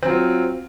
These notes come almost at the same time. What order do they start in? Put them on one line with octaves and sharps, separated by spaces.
C4 F#3 F4